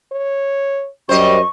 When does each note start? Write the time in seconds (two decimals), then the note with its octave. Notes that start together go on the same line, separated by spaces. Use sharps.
0.12 C#5
1.09 F#2 G3 C5 D#5 C#6